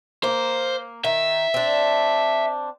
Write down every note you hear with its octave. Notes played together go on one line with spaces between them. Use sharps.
A#3 C5
D#3 E5
C4 D4